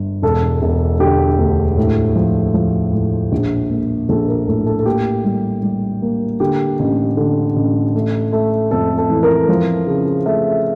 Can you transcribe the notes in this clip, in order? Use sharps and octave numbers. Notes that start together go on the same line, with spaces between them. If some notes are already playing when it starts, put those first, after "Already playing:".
Already playing: G1
E1 A4
E1
D3 G4
D2
A2
F3
F3
A2
A#1
A#3
A#1 A4
A#4
A2 A4
A4
A4
A#3 G4
G3
G3
A#3
D3 G4
A1
D3
A1
A3
A3
F2 A4
A4
E3
A#4
F3
C#3
A3 E5